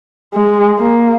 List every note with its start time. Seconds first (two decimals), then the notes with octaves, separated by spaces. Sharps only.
0.34 G#3
0.80 A#3